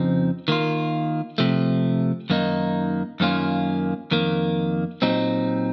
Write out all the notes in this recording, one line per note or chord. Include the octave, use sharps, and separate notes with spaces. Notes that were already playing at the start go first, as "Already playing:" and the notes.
Already playing: F2 C#3 F3 C4 D#4
D#3 A#3 F4
C3 F3 A3
F#2 D#3 A#3 D#4
F#2 D#3 A#3 C#4 F4
F2 D#3 A#3
A#2 F#3 C4 D#4